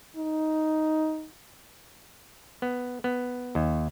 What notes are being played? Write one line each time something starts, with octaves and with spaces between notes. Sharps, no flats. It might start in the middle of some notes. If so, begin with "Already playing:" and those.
D#4
B3
B3
D#2